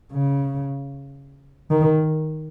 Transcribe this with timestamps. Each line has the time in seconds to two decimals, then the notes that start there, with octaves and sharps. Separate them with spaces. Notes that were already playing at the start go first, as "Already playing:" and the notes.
0.13 C#3
1.71 D#3